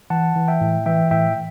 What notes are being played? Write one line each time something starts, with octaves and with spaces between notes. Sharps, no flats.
E3 F#5 A5
E3
E5 G5
A2
E3 E5 G5
A2 E5 G5